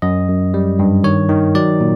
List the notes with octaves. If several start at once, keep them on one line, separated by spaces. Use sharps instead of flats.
F#2 D#5
F#2
G3
G2
D#3 C#5
D#3
F#3 D5
A#2